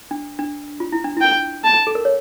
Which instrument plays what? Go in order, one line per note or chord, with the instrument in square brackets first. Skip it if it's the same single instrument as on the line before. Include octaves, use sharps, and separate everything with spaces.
[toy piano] D4
D4
F4
E4
D4
[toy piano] E4 [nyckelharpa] G5
[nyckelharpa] A5
[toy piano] A4
A#4
C#5